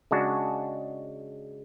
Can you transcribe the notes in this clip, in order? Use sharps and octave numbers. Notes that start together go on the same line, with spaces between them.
C#3 G#3 D4 F#4